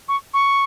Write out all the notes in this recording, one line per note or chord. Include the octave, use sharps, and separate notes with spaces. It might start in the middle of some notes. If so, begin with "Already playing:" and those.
C#6
C#6